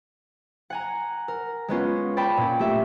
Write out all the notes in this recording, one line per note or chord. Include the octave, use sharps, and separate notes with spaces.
F#5 G#5 A#5
A#4
G#3 B3 C#4 F4
D5 G5 A5 B5
A#2 C#4
A3 G4 E5